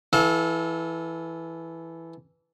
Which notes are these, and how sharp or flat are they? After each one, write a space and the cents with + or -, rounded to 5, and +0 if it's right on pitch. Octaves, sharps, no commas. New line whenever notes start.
E3 +0 A4 -20 F5 +30